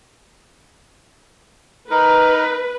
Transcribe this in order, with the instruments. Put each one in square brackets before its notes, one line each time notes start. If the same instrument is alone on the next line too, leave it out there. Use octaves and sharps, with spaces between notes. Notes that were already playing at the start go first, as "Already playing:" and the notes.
[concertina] D#4 A#4 [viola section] B4